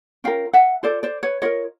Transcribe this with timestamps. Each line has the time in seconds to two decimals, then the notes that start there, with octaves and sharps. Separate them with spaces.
0.24 C#4 F4 A#4 F5 G5
0.53 E5 F#5
0.83 F4 A4 C5 D5
1.03 C5 D5
1.23 B4 C#5
1.42 F4 A#4 C#5 D#5